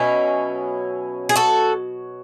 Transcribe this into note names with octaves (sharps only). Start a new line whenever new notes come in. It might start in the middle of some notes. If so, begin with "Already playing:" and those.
Already playing: B2 F#3 C#4 E4
G#4
F#4 A4